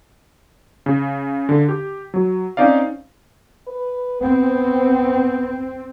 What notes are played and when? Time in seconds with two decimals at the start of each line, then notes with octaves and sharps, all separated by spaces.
0.86 C#3
1.49 D3
1.69 G4
2.14 F#3
2.57 C4 C#4 D#4 D5 F5
3.67 B4
4.21 B3 C4